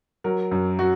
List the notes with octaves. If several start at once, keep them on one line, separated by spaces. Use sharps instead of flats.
F#3 A#4
F#2
F#3 F#4